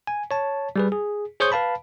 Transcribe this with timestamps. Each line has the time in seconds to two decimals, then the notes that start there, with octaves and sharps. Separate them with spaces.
0.07 G#5
0.31 C#5 A5
0.76 G3 G#4 B4
0.92 G#4
1.40 G#4 C5 C#5 C#6 D#6 G6
1.52 B4 F5 A5 B5